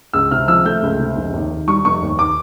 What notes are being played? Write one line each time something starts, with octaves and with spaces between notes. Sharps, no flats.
C#2 E6
C3 F6
F3 E6
A3 G6
C#2
C3
F1
D#2
D#3
G3 C#6
F1 C#6
D#2
D6